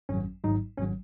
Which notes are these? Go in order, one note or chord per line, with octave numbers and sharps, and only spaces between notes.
G#1 F#2 F#3 C#4
G#1 G#2 F#3 D#4
G#1 F#3 C#4